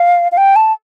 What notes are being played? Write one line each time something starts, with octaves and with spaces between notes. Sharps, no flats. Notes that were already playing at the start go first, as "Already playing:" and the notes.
Already playing: F5
F5
G5
A5